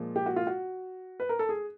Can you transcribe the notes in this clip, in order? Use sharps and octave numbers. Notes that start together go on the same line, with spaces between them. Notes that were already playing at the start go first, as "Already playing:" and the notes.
Already playing: A#2 F3 G#3
G4
F#4
F4
F#4
B4
A#4
A4
G#4